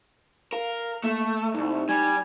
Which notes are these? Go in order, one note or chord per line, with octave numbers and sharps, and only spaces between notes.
A#4 F5
A3 A#3
C2 G2 D#4
G3 G#5